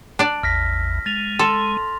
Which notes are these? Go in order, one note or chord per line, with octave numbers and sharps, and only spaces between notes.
D4 D5
A1 E2 F6 A#6 B6
G#3 A6 F7
A4 C6